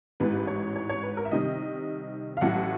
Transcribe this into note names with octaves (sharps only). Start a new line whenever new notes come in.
A1 G#2 E3 B4
C#5
C#5
C#5
B4
A#4
E5
C2 C3 D#3 G3 D#5
F5
A1 A2 F#3 A3 F#5